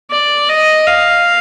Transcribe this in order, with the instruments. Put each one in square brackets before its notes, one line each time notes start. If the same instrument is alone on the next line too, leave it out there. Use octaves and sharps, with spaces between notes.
[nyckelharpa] D5
D#5
F5